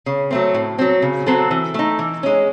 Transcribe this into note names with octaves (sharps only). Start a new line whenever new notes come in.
C#3
F#3 A3 C4
A2
F#3 C4
C#3
F#3 C4 F#4 A4
E3
A3 D#4
E3
G#3 C#4